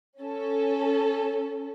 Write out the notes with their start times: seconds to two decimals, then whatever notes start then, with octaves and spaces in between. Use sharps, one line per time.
0.22 C#4 A4